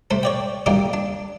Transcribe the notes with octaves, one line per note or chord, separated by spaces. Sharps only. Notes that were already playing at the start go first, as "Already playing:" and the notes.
C3 A3 C5
C#5 D5 G5
D3 D#3 G3 A#3 D#4 G4
D4